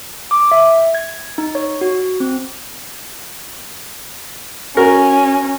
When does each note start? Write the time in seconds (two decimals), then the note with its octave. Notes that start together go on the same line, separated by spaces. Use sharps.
0.31 D6
0.51 E5
0.95 G#6
1.38 D#4
1.55 C#5
1.81 F#4
2.20 C4
4.77 C#4 F#4 A#4